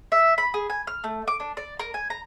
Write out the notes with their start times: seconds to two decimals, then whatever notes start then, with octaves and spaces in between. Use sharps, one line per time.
0.12 E5
0.38 B5
0.54 G#4
0.70 G#5
0.87 F6
1.04 A3
1.28 D6
1.40 D4
1.57 D5
1.79 A#4
1.94 G#5
2.10 A#5